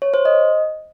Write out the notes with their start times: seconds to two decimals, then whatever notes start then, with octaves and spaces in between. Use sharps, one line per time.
0.02 C#5
0.14 C5
0.25 D#5